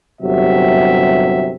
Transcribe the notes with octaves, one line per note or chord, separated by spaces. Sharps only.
G1 C3 F#3 E5